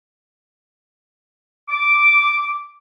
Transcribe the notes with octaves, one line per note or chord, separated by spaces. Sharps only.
D6